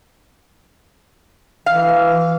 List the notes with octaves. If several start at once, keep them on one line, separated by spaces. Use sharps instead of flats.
E3 F5